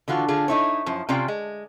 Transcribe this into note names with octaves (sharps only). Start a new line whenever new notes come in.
D3 E3 F4 F#4
D3 F4 G#4
D#4 E4 C#5
F#2 F3
C3 C#4 F4 D5 G5
G#3